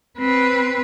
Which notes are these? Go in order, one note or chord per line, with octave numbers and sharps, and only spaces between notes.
C4 B4